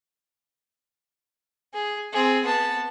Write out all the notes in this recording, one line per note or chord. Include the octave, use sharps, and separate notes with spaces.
G#4
C4 G#4
B3 A5